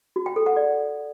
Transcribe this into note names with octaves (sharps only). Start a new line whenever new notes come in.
F#4
G5
A4
F#5
D5